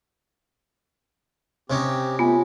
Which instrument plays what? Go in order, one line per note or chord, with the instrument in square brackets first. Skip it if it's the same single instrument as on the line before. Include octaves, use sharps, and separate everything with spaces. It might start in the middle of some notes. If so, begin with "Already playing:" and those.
[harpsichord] C3 C#4 D#4 [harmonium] C4 G4
[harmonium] A3 [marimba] B3 [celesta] F4 G#5